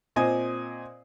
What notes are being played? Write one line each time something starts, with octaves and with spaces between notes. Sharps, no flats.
A#2 C4 C5 D#5 G#5 D#6